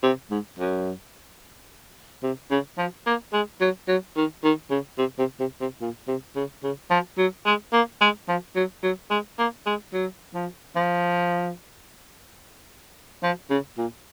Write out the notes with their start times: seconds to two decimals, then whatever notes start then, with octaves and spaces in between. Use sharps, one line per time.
0.03 C3
0.31 G#2
0.59 F#2
2.23 C3
2.50 C#3
2.78 F3
3.07 A#3
3.33 G#3
3.61 F#3
3.88 F#3
4.16 D#3
4.44 D#3
4.70 C#3
4.98 C3
5.18 C3
5.40 C3
5.61 C3
5.81 A#2
6.08 C3
6.35 C#3
6.63 C#3
6.90 F3
7.18 F#3
7.46 G#3
7.73 A#3
8.01 G#3
8.28 F3
8.56 F#3
8.83 F#3
9.10 G#3
9.39 A#3
9.66 G#3
9.93 F#3
10.34 F3
10.76 F3
13.23 F3
13.50 C#3
13.78 A#2